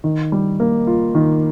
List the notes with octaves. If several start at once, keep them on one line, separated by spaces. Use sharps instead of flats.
D#3
G3
A#3
F4
D#3